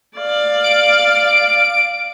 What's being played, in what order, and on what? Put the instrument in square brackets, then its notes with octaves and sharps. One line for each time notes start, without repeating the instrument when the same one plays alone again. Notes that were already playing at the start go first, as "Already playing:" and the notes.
[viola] D5 F5
[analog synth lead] D7